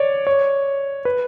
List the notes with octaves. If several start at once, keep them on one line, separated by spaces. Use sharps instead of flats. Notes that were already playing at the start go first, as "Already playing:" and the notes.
Already playing: C#5 D5
C#5
B4